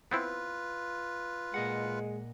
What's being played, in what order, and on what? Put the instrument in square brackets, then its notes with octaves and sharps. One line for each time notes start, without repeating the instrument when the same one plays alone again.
[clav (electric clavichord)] B3 C4 E4 [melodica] F4 B4
[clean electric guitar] A#2 D#5 F#5 [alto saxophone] G#3